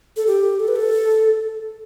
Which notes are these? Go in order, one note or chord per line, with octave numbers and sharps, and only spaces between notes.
A4
G4
A4
B4
A4